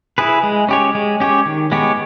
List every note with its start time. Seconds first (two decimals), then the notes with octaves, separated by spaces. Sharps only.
0.18 E4 G#4 B4
0.43 G#3
0.69 C#4 G4 C#5
0.95 G#3
1.20 C#4 G4 C#5
1.46 D#3
1.72 G#3 B3 G4 C#5